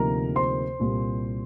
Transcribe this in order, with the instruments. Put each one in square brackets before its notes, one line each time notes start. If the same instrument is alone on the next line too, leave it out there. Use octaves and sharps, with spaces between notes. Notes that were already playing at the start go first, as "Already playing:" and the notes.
Already playing: [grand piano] D2 C3 F3 A#3 D#4 A#4 A#5
C5 C6
C2 A#2 G3